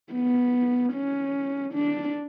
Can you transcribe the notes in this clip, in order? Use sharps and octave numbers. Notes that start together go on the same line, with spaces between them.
B3
C#4
D4